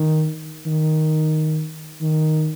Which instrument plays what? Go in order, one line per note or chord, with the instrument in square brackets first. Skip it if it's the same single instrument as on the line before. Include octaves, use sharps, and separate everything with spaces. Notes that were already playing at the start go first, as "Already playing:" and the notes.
Already playing: [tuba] D#3
D#3
D#3